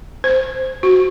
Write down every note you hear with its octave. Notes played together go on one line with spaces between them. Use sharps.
C5
F#4